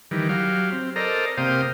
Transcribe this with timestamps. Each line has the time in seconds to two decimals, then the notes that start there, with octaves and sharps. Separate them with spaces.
0.11 D#3 E3 G3
0.29 F#3 G4 F5
0.72 C4
0.96 A4 A#4 C5 D5 D#5 A#5
1.38 C3 A#3 C5 F5 G5 D#6